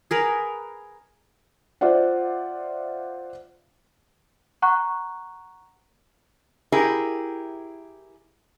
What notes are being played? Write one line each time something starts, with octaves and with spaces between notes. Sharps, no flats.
G#4 A#4 B4
F4 C5 D5 E5 F#5
F#5 A#5 C#6 F#6
E4 G4 G#4 A#4